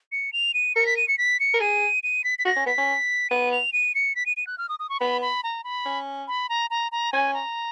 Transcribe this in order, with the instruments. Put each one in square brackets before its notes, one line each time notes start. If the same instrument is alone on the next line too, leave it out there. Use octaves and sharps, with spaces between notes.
[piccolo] C#7
F7
D#7
[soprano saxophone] A#4 [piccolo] C#7
[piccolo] B6
D#7
C#7
B6
C#7
[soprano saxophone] A#4
[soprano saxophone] G#4 [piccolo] D#7
[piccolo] D#7
B6
B6
[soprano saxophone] F#4 [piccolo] A#6
[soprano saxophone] C#4
[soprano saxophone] B3 [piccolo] B6
[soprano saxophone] C#4
[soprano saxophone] B3 [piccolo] D#7
[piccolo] F7
D#7
C#7
B6
D#7
D#7
F#6
F6
D#6
D#6
C#6
[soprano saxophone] B3 [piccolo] B5
[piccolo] B5
A#5
B5
[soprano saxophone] C#4
[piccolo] B5
A#5
A#5
A#5
[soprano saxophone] C#4 [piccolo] G#5
[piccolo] A#5